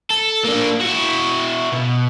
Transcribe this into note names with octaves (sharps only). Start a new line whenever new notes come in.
A4
A#3 D4
E4 F#4
B2